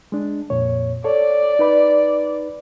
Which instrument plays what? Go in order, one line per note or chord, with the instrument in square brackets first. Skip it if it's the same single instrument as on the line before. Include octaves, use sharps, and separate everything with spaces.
[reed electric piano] G#3 D4
F2 A#2 C#5
[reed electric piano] A4 C#5 [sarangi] D5
[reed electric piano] D#4 B4 B5